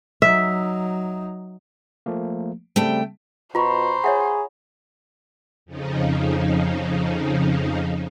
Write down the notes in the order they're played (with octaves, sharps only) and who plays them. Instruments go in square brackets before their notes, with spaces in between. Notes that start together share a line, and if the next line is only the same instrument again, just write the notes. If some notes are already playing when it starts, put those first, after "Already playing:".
[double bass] F#3 D#4 [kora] E5
[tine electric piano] F3 A3 A#3
[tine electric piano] C#3 G3 C4 [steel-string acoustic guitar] A3 G5
[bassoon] B2 [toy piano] F4 [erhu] C5 [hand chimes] A#5 B5 C#6
[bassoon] G#4 [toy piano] C#5 E5 F#5
[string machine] F2 C#3 F3 D#4